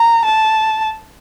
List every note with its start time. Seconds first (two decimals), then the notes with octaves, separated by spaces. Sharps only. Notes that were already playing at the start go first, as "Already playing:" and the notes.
Already playing: A#5
0.25 A5